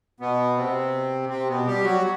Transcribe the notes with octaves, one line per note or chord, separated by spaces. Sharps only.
B2 B3
C3 C4
C3 C4
B2 B3
G3 G4
F#3 F#4